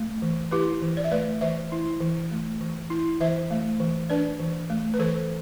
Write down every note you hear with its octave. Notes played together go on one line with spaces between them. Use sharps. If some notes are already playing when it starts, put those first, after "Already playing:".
Already playing: A3
E3
E4 G4 B4
E3
D5
E5
A3 B4 D5
E3 C5 E5
E4
E3
A3
E3
E4
E3 C5 E5
A3
E3
D4 B4 D5
E3
A3
B4
E3 A4 C5